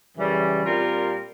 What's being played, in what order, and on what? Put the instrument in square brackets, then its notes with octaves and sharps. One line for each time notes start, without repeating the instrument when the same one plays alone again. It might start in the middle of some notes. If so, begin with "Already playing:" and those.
[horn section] F#2 C#3 E3 G3
A#2 G3 C4 F4 A#4